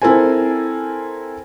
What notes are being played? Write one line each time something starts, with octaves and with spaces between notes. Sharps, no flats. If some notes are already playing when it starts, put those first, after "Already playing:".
C4 E4 A4 A#4 C5 G#5